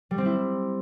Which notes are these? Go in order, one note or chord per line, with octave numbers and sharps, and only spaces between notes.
G3
C4
E4